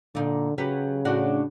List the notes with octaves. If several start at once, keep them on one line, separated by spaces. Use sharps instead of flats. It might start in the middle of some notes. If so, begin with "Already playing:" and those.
A#2 D3 D#4
C#3 F#3 G4 B4
A2 D4 F#4